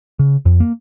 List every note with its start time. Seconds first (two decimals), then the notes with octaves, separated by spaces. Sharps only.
0.19 C#3
0.45 F2
0.60 A#3